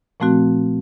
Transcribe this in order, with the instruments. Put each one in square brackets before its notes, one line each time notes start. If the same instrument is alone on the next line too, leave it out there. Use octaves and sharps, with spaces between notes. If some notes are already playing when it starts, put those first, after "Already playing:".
[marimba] A#2 F3 A3 C4 F#4